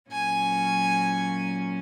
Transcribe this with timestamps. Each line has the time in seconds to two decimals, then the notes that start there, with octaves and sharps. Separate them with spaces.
0.11 A#2 F#3 C#4 G#5